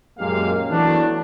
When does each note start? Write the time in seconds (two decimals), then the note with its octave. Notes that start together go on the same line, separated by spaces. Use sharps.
0.18 F#2 A#2 G#3 A#3 G4 F5
0.70 E3 F#3 A3 B3 D4